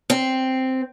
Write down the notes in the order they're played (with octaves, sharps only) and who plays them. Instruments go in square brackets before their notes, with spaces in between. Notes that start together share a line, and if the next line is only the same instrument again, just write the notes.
[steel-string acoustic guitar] C4